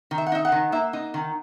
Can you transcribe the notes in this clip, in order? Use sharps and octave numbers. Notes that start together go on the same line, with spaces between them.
D#3
E5
F#5
D#4 E5
F#5
D#3
A#3 E5
D#4
D#3